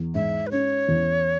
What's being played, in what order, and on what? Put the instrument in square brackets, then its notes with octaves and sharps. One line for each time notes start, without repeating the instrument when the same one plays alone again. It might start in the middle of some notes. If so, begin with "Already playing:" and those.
Already playing: [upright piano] E2
[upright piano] G#2 [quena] E5
[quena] B4
[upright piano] C#4 [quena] C#5
[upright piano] E2